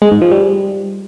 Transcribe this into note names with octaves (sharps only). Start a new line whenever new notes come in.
G#3
G#2
F3
G3